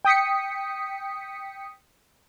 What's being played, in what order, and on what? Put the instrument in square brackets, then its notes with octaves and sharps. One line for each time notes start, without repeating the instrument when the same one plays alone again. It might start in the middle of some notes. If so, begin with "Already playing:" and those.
[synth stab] G5 D#6 B6 C#7